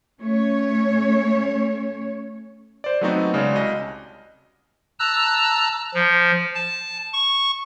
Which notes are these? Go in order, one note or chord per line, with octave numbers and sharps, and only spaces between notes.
A3 C#4 C#5
C5 D5
F#3 A3 B3 C4 D#4 F#4
C#3 G#3 F#4 D5
C2 D#5
A5 A#5 E6 F#6
F3
A5
C#6